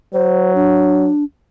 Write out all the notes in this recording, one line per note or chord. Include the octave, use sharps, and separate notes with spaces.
F#3 C5
D4